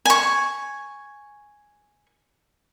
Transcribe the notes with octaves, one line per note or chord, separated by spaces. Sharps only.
G#5 C#6